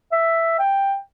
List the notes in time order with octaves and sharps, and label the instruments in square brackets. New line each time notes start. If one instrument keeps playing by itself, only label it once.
[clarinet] E5
G5